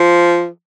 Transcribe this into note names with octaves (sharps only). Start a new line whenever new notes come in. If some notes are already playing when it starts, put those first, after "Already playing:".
Already playing: F3